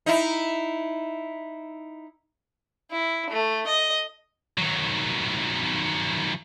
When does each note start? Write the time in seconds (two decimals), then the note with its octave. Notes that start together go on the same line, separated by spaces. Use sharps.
0.06 D#4 E4
2.91 E4
3.30 A3
3.67 D#5
4.58 D#3 F#3